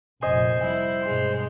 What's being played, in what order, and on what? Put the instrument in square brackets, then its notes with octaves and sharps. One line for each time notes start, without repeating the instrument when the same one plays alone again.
[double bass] F1 A#1 [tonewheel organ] C5 [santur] D#5 [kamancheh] G#5
[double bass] G3 [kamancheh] E4
[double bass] G2 B2 [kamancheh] G#3 C6